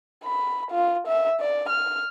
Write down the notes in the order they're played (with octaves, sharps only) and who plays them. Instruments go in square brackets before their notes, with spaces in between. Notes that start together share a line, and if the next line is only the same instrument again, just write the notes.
[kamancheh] B5
F4
E5
D5
F6